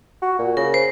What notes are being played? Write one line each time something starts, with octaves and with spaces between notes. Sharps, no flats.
F#4
A#2
C#3 A#4
C5